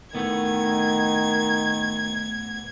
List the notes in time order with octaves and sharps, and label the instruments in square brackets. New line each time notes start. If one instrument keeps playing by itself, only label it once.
[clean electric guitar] A2 A3 B3 [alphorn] D#3 [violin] G#6